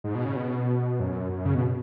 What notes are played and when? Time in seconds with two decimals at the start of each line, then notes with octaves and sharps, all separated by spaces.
0.04 G#2
0.15 B2
0.25 C#3
0.36 B2
1.00 F#2
1.32 F#2
1.45 C#3
1.55 B2